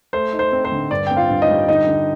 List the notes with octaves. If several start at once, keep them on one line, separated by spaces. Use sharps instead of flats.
A3 C5
D#4
C5
C4
C5
D3
G2 D5
C4 G5
F4 F5
G2
D#4 D#5
G3
D3 D#4 D#5
D3